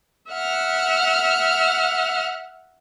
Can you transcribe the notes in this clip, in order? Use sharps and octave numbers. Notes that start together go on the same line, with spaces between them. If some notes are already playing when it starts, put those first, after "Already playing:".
E5 F#5 F6